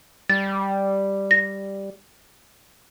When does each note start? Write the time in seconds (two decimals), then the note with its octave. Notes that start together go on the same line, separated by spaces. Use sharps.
0.30 G3 A6
1.31 A#6